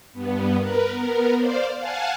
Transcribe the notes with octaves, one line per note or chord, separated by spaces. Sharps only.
G2 B3
A#4 B4
B3 A#4
C5 D5 F5
F5 F#5 G#5 A5